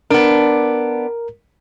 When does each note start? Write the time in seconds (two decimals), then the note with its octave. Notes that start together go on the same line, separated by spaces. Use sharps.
0.11 B3 D4 A#4